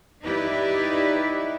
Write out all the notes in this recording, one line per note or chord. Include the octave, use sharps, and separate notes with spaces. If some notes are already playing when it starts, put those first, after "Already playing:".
D#4 E4 G4 B4 D5 E5